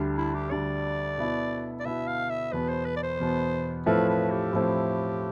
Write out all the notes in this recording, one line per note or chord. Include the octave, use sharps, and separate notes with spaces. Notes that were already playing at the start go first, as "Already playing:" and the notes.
Already playing: D2 D3 G3
E4
G4
D2 D3 G3 D5
B2 B3 E4
D5
B2 B3 E4 E5
F5
E5
E2 B2 B3 B4
C5
B4
D5
C5
E2 B2 B3
A2 F3 A3 C4 E4 B4
B4
G4
A2 F3 A3 C4 E4